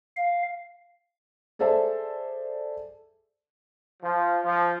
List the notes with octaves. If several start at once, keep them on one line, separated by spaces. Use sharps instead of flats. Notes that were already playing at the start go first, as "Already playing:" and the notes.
F5
G#4 A4 C5 D5 E5 A5
F3
F3